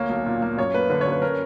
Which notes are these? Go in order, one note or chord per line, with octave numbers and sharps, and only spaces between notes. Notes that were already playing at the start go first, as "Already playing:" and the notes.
Already playing: D2 A#3 C#5
B1
A#2
A#3
F#2 C#5
A#3 B4
D3 B4
C#5
F#2
B4
C#4 A#4